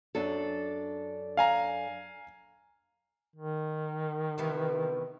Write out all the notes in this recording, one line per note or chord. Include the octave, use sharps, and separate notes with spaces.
F#2 D4 A4
F5 G#5 A#5
D#3
C3 E3 B3